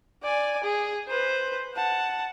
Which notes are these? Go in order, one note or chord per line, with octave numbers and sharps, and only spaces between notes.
D5 G#5
G#4
B4 C5
F#5 A5